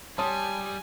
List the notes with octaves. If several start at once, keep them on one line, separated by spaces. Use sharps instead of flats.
G3 C#5 G#5 A5 C6 D#6